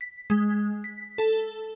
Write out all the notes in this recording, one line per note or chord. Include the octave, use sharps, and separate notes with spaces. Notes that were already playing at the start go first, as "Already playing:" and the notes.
B6
G#3
B6
A4